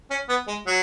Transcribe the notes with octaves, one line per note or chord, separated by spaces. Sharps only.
C#4
B3
G#3
F#3